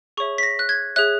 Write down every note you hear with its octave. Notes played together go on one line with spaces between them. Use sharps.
G#4 C#5 E5 C#6
B6
A#6
F#6
G#6
G#4 C#5 E5 F#6